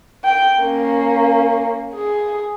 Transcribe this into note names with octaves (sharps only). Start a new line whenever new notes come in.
G5
A#3 C#4
G#4